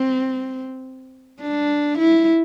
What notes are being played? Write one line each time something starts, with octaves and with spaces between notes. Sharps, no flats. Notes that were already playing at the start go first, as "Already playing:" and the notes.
Already playing: C4
D4
E4